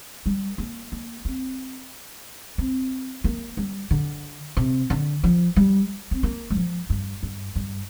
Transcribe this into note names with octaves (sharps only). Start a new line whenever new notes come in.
G3
A#3
A#3
C4
C4
A#3
G3
D3
C3
D3
F3
G3
C4
A#3
G3
F3
G2
G2
G2